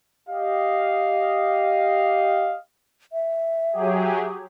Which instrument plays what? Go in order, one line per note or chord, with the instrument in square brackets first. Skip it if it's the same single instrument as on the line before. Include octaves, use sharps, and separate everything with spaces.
[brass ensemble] G4 D#5 F5
[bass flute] E5
[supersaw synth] F#3 G4 G#4